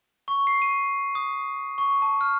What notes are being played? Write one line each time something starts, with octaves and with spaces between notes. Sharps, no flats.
C#6
C7
D#7
D#6
C#6
A5
F6